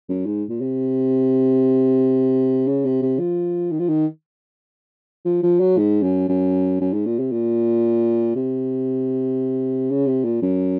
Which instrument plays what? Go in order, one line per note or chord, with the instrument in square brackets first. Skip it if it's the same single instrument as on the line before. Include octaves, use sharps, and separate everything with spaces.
[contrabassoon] F#2
G#2
A#2
C3
C#3
C3
C3
F3
D#3
F3
D#3
F3
F3
F#3
G#2
F#2
F#2
F#2
G#2
A#2
C3
A#2
C3
C#3
C3
A#2
F#2